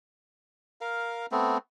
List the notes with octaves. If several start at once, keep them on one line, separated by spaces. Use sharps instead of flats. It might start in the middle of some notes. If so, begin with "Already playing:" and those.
A#4 F5
A3 B3 C4